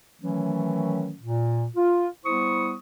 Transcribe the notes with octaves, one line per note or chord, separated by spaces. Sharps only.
D#3 E3 F#3 A3 C#4
A#2
F4
G3 B3 E4 C5 C#6 D#6